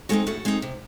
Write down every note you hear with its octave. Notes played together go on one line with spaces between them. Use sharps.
G#3 C4 D#4 F#4 A4
A2 F#4 A4
G#3 C4 D#4
C3